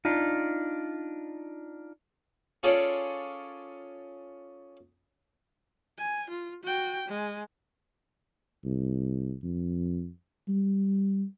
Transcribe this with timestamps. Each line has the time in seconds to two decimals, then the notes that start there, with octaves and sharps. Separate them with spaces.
0.05 D4 D#4 F4
2.63 C#4 F4 G#4 A4 C#5 D5
5.98 G#5
6.30 F4
6.63 F#4 G5
7.08 G#3
8.65 C2
9.43 F2
10.48 G3